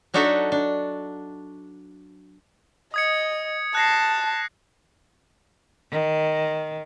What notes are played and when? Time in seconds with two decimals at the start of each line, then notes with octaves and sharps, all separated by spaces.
0.14 F#3 D4 D#4 F#4 A4 E5
0.52 D4
2.94 D#5 D#6 G#6 C#7
3.75 A5 F#6 A#6 C7
5.91 D#3